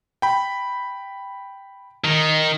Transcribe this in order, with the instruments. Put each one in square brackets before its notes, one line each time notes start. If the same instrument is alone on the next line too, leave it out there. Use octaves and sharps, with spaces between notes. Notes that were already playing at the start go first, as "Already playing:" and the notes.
[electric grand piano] G5 B5
[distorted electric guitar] D#3